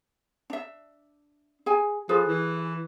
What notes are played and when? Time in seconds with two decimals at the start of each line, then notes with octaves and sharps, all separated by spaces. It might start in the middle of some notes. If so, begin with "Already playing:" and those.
0.50 D4 E5
1.66 G#4 G#5
2.09 F3 G#4 A4 B4
2.28 E3